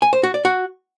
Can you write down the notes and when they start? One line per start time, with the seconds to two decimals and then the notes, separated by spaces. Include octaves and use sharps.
0.02 G#5
0.13 C5
0.23 F#4
0.34 D5
0.45 F#4